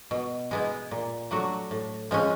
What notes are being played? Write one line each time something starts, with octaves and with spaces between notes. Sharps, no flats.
B2
G#3 B3 E4
A#2
F#3 A3 D4 F#4
A2
F3 G#3 C#4